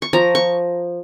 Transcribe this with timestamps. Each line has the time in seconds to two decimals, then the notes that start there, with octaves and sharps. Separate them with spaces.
0.02 C#6
0.13 F3 A#5
0.35 C#6